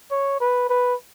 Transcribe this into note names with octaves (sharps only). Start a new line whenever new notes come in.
C#5
B4
B4